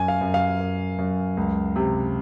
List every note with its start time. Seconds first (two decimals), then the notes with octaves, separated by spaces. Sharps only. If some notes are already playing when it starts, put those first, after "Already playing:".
Already playing: F#2 G#5
0.08 F5
0.21 F#2
0.34 F5
0.60 F#2
0.98 F#2
1.37 C#2
1.76 C3